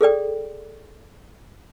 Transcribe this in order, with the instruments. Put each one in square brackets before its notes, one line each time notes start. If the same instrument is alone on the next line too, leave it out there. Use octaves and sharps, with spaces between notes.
[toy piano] G#4 A4 D5 G5